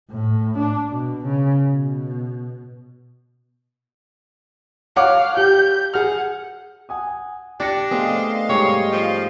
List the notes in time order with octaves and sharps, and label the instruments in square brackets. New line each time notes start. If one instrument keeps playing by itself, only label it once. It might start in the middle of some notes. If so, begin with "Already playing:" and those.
[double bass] A2
D4
B2
C#3
B2
[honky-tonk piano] C#5 F#5 D6 [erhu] F5
[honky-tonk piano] G4 [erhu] G6
[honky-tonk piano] G#4 F6 [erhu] F#5
[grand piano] F#5 G#5 D#6
[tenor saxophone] D4 [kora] G4 [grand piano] A6 A#6 C#7
[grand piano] A3 B3 [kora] C4 G#4 [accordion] D#5 F5 C6
[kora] G#2 G3 [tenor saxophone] C#5
[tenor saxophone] F3